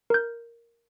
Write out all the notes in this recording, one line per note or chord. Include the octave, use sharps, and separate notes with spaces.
A#4 G6